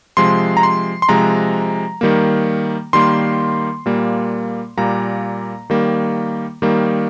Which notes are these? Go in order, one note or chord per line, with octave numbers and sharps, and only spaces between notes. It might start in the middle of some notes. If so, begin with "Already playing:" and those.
C3 F3 G#3 C6
A#5
C6
C6
C3 F3 G#3 A#5
D#3 G3 A#3
D#3 G3 A#3 C6
A#2 G3 A#3
A#2 G3 A#3 A#5
D#3 G3 A#3
D#3 G3 A#3